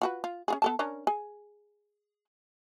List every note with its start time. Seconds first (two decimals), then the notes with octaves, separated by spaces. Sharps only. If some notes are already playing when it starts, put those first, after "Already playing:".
0.02 F4 F#4 B4
0.24 F4
0.48 C#4 F4 G#4
0.62 B3 A4 A5
0.79 C#4 D4 A#4
1.07 G#4 G#5